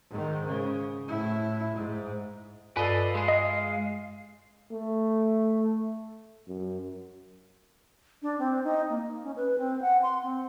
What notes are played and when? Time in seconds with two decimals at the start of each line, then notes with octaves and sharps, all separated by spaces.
0.10 G#2 D#3
0.47 C#3
1.07 A2 E4
1.75 G#2
2.77 G2 A4 B4 D5 D#5 F5
3.15 G#3 G#4 F5
3.28 D#5
4.71 A3
6.48 F#2
8.22 D4
8.39 C4
8.64 D#4
8.90 A#3
9.24 C#4
9.36 B4
9.58 C4
9.82 F#5
10.03 C6
10.23 C4